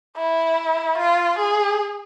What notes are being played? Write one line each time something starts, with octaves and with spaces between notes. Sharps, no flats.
E4
F4
G#4